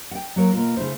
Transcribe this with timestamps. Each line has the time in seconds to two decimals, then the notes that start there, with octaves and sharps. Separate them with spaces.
0.11 F#5 G5
0.36 F#3 A#3 A4 A#4 C#5
0.53 B2 A#3 F4
0.77 C#3 A3 E4 C5